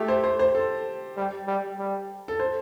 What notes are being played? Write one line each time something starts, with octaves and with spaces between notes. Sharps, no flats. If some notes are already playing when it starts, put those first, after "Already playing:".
Already playing: A3 G4
C5
C5
C5
A4
G3
G3
G3
A4
C5